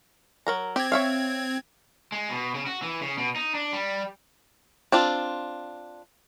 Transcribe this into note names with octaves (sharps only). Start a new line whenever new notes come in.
F#3 A#4 A#5
C4 G4 G#6
C#5 E5 F5
G#3
B2
C#3
F#4
E3
C#3
B2
D#4
D4
G3
C4 D4 F4